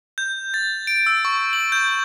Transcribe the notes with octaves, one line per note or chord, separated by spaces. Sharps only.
G6
A6
D7
E6
C#6
F#7
G6